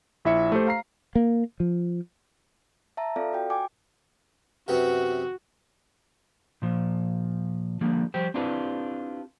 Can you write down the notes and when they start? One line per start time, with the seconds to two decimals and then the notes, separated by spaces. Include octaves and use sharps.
0.25 A#1 E4 E5 C#7
0.52 A3 G4 C5
0.67 F5 A#5 C7
1.15 A#3
1.60 F3
2.97 E5 A5 A#5
3.16 C4 F4 A4 D5 F5
3.33 F#4 G5
3.50 G5 G#5 D6
4.68 F#2 C3 B3 F#4
6.62 A#2 F3
7.81 D3 F3 G3 A#3
8.14 F3 G3 G4 C5
8.34 C4 D4 E4 F4 G4 B4